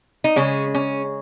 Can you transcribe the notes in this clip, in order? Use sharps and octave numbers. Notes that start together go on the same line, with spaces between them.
D#4
C#3 G#3 C#4
C#4